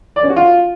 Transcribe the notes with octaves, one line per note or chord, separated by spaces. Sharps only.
D5
C#4
F#4
F4